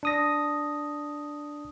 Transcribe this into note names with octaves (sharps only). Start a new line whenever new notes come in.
D4 D#6 A#6